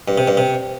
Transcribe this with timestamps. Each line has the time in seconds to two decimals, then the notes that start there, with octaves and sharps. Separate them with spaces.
0.08 G2
0.18 C3
0.27 G2
0.37 C3